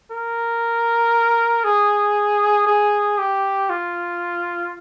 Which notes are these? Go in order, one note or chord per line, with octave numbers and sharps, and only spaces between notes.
A#4
G#4
G#4
G4
F4